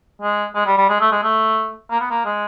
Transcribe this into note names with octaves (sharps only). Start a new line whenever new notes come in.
G#3
G#3
G3
G3
G#3
A3
G#3
A3
A#3
B3
A#3
G#3